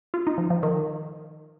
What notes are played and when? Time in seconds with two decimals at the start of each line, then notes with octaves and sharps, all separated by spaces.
0.14 F4
0.27 D#4
0.38 F3
0.50 F3
0.63 D#3